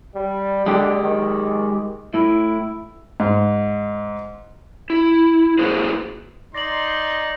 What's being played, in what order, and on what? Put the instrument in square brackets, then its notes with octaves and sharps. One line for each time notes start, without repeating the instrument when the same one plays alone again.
[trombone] G3
[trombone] D3 [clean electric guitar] G#3 G4
[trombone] D#3
[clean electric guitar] A2 [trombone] E4
[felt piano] G#2
[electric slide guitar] E4
A#3 E4 F#4 G#4 B4 C5
[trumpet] D#4 [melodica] D5 [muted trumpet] C6 [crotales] A#6 F#7